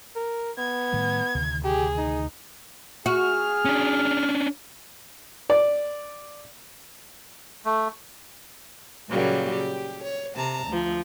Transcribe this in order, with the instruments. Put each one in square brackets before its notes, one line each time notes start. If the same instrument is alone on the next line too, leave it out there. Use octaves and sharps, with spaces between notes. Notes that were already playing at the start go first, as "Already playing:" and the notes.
[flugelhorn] A#4
[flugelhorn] B3 [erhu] G#6
[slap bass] A2 D#3 G3
D2 C3 D#3
[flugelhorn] G4 [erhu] G#4
[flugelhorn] D#4
[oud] F#4 [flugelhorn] G#4 [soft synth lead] F6
[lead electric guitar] C#4 D4
[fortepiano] D5
[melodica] A3
[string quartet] A#2 C#3 F#3 G3 A#3
G4
C#5
C3 A5 A#5
D2 F3